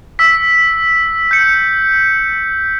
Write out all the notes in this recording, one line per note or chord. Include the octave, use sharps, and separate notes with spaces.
E6 B6
G6 C#7